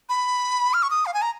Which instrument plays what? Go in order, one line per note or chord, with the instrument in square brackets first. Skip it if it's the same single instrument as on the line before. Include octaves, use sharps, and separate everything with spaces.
[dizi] B5
F6
C#6
D#6
F5
G#5
A#5